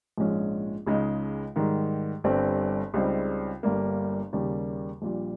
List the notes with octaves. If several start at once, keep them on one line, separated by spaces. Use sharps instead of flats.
A#1 G#2 F3 G#3 C#4
C#2 C#3 G#3 D#4
G#2 D#3 G3
G1 G2 G3 C4
C#2 C#3 G3 C4 D#4
G1 G2 G3 A#3
D#2 C#3 G3 A#3
A#1 A#2 G3